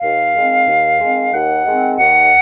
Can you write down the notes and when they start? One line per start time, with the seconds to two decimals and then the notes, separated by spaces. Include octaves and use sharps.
0.01 D#2 F5
0.34 D#3 G#3 C4
0.66 D#2
0.99 D#3 G#3 C4
1.32 D#2 F#5
1.64 D#3 G#3 C4
1.97 D#2 F#5